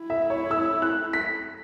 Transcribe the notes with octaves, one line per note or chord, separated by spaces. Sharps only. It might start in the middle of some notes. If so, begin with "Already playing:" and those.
Already playing: E4
E5
C#5
E6
F#6
B6